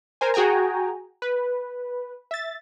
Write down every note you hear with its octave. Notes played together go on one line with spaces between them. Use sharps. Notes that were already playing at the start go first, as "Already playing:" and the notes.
A#4 C5 G#5
F#4 G#4 G5 G#5 A#5
B4
E5 A6